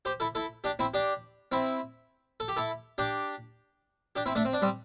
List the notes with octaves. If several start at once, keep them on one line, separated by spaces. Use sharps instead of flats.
G4 C5
E4 A4
E4 A4
D4 G4
C4 E4
D4 G4
C4 E4
A4
G4
E4 A4
D4 G4
D4 G4
C4 E4
A3 D4
C4
D4
G3 C4